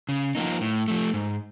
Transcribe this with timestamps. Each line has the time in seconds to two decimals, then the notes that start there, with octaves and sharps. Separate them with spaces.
0.09 C#3
0.35 F3 A#3 D#4
0.61 A2
0.88 F3 A3
1.14 G#2